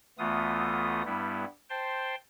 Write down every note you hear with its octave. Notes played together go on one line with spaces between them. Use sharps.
D2 E3 A3 B3 F4 D#6
G2 G3 B3 E4
C5 G5 A5 C6